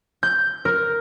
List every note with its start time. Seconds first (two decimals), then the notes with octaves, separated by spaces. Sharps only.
0.23 G6
0.65 A#4